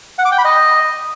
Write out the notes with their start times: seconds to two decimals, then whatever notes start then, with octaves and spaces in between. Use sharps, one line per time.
0.18 F#5
0.25 D6
0.32 G5
0.38 B5
0.45 D#5